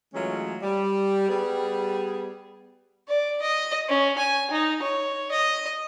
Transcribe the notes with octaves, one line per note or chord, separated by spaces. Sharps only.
E3 F#3 G#3 A3 C#4 F4
G3
G3 B3 G#4
D5
D#5
C#4
G#5
D#4
C#5
D#5